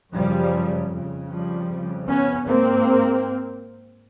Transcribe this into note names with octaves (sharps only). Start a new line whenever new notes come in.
F#2 C#3 F3 G3
F2 C#3
F3 G3
F2 C#3
B3 C#4
G#2 A#3 C4